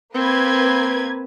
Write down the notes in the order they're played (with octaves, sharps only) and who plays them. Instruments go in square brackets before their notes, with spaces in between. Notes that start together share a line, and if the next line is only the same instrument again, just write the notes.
[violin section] A#3 B4 G#6 [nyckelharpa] C4